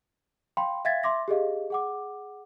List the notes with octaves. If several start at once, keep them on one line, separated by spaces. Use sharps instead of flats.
F5 G5 B5 C6
E5 F5 G5 G#6 A6 B6
E5 C6 D6 A#6
G4 G#4 D#5 F5
G#4 F#5 D6